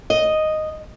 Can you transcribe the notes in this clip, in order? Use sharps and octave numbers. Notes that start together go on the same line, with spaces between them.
D#5